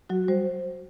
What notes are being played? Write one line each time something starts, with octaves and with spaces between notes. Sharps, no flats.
F#3 F#4
G3 C5